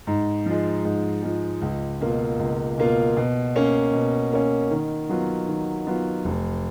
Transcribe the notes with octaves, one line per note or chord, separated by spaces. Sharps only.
G#2
F3 G#3
G#2
F3 G#3
C#2
B2 A#3 F4
C#2
B2 A#3 F4
B2
A#3 C#4
B2
A#3 C#4
D#3
F#3 B3 F4
D#3
F#3 B3 F4
F1